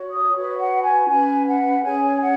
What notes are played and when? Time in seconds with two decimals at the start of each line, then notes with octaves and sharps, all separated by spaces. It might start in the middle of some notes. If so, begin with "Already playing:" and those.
Already playing: F#4 C#5
0.09 D#6
0.33 F#4 B4 C#5
0.58 F#5
0.83 G#5
1.07 C#4 B4 G#5
1.45 F#5
1.82 C#4 G#4 C#5 G#5
2.20 F#5